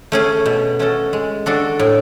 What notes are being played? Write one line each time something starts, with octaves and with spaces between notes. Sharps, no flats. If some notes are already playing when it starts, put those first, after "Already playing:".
A3 C#4 G#4
B2
A3 C#4 F#4 A4
G#3
D4 F#4 A4
A2